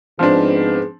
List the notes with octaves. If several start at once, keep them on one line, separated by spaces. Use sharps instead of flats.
G#2 F3 B3 C4 D4 G#4